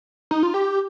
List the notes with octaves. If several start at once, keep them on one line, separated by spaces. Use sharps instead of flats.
D#4
F4
G4